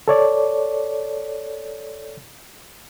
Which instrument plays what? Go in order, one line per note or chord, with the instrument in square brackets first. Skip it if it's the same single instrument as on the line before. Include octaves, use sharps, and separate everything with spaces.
[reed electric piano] A4 C#5 D5